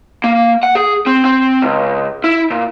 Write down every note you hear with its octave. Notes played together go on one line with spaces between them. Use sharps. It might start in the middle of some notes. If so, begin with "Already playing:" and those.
A#3
F#5
G#4
C4
C4
C#2
E4
A#2